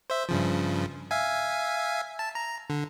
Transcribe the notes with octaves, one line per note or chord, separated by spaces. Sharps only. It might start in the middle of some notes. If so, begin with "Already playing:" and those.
C5 E5
G2 C#3 F3
E5 F5 G#5
A5
A#5
D3